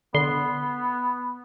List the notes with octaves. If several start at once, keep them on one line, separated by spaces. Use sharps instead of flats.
D3 B3 C6